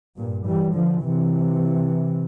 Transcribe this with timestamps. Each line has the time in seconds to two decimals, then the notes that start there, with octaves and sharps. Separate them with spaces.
0.17 G2 A#2
0.46 E3 G3
0.74 D3 F3
1.03 C3 E3